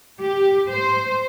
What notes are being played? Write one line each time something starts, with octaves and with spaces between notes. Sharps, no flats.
G4
C5